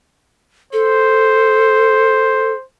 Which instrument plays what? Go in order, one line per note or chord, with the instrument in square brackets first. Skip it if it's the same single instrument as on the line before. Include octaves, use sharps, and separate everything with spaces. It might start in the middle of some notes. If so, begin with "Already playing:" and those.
[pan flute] A4 [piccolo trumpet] C5